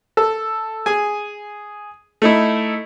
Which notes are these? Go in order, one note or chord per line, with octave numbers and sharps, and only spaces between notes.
A4
G#4 G#5
A3 D#4 E4